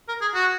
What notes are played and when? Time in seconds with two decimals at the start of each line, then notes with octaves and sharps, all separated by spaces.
0.08 A#4
0.21 G#4
0.34 F#4